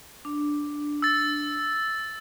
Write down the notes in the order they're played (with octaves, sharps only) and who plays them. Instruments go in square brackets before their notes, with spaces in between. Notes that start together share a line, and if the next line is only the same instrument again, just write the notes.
[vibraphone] D4
[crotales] E6 A6